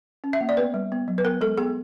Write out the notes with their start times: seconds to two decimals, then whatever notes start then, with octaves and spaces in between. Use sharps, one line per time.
0.24 C#4
0.33 E5
0.41 A#3
0.49 D5
0.57 B3 B4
0.74 G3
0.92 B3
1.08 F#3
1.18 B4
1.24 B3 A#4
1.41 G#3 A4
1.58 B3 G#4